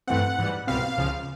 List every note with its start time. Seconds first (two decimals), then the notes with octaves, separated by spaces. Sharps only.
0.07 G2 E3 A3 C4 F#5
0.38 G#2 E3 G3
0.67 C2 B2 G3 C4 F5
0.98 C#2 C#3 F3